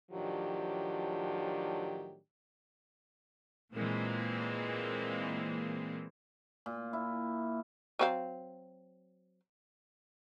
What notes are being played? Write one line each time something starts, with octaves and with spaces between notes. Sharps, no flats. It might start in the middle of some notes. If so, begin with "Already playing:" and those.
A2 D#3 F3 F#3 D4 G4
A#2 E3 G#3 A#3 C4
A#2
E4
F#3 C4 F5